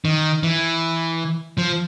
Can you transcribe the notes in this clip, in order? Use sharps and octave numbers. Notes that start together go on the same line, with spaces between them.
D#3
E3
F3